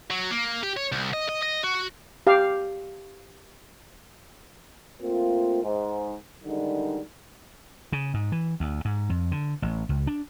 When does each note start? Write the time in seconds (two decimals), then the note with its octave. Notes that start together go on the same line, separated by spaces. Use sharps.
0.11 F#3
0.31 A#3
0.63 G4
0.77 C#5
0.92 C2
1.13 D#5
1.29 D#5
1.43 D#5
1.64 F#4
2.27 G4 F5
5.02 A3 A#3 C4 F4
5.63 G#2
6.44 D3 D#3 G3 G#3 D#4
7.92 C#3
8.14 G#2
8.32 E3
8.60 D2
8.85 G#2
9.10 F2
9.31 D3
9.62 A1
9.89 C#2
10.07 D4